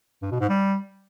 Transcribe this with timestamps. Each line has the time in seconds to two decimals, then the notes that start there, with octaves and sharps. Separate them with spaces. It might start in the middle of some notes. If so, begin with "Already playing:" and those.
0.22 G2
0.31 B2
0.40 G#2
0.49 G3